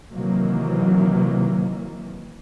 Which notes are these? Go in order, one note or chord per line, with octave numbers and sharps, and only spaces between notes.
C3 D#3 E3 F#3 A#3